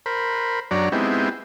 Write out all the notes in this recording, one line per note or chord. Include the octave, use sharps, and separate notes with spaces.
A#4 C5 B5
F#2 F#3 D4 C#5 D5 A#5
G#3 B3 C4 D#4 E4 G4